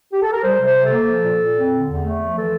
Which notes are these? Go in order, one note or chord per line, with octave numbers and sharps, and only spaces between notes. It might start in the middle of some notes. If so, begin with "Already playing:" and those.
G4
A4
A#4
G3 C5
C3
C5
C3
A4
A#3
F3
A#2
A#2
C4
D3
E2
A3
F3
E3 A4